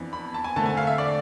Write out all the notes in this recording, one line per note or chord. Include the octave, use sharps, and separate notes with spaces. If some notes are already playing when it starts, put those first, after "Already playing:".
Already playing: F2 E3 B3 D4
B5
A5
G#5
D3 A3 C4 A5
G#5
F5
E5
D5